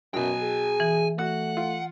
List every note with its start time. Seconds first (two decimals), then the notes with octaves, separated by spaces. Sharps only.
0.14 F#2 B2 F#3 G5 G#5
0.43 G#4
0.80 E3
1.19 A3 F#4 F#5 F#6
1.57 F4